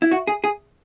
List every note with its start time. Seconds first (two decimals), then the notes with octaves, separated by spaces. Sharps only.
0.02 E4
0.11 F#4
0.27 G#4
0.44 G#4